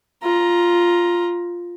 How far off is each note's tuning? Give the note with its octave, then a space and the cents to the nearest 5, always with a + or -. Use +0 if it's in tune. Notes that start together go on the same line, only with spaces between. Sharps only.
F4 +0 A#5 +15